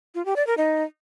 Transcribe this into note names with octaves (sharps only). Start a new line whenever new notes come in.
F4
G4
D5
A#4
D#4